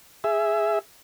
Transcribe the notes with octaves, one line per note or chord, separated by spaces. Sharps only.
G#4 E5